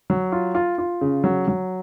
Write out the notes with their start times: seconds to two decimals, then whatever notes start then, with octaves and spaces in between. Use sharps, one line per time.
0.10 F#3
0.32 F4
0.55 F4
0.78 F4
1.01 C#3
1.24 F#3
1.48 F#3